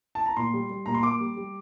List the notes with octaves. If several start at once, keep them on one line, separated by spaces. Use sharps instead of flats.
A5
A#5
A#2 C6
G3
G3
A#2 A#5
C6
A#3 D6
G3
G3